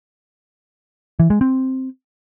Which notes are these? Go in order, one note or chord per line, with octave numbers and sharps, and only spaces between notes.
E3
G#3
C4